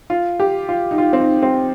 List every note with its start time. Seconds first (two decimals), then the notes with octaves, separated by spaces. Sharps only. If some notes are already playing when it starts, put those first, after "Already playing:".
0.10 F4
0.40 G4
0.69 F4
0.91 D#4
0.98 F4
1.13 C4
1.20 D#4
1.42 C4